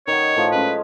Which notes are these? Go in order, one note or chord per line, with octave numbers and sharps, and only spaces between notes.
D#3 C#5 F#5
A2 F3
G#3 C#4 B4